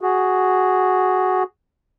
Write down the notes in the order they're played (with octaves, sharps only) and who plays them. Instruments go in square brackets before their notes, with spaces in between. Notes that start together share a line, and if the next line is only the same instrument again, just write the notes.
[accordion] F#4 G#4